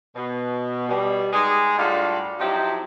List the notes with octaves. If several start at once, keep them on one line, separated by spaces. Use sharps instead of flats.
B2
B2 G3
G#3 D#4 G#4
A2 G3 D4 F4 F#4 F5
F3 F#3 C4 D#4 E4 G4